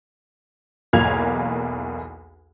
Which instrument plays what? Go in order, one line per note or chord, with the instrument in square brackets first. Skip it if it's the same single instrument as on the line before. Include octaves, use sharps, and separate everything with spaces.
[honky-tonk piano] B1 E2 A#3 F5 G#6 F7